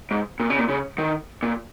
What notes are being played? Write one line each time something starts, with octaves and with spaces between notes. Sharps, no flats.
G#2
A#2
C#3
A#2
C#3
D#3
A#2